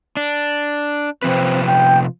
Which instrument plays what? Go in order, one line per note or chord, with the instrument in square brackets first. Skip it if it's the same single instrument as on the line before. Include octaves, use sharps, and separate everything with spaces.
[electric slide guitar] D4
[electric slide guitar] C3 F3 B4 [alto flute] C4
[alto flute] G5